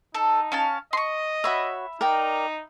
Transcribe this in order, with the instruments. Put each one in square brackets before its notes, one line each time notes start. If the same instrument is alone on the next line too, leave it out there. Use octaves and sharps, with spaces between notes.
[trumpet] D#4 [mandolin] A4
[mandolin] C#4 F5 A5
[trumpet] D#5 [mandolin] C6 C#6
[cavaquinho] F#4 C#5 [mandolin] E5 B5
[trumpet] D#4 [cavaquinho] A#4 D5 G5